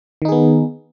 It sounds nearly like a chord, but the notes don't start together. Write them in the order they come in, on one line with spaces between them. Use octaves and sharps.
D#3 D#4 G#4 B3